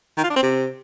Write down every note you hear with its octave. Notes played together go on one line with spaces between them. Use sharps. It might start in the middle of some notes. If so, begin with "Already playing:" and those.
D#3
F4
D4
C4
C3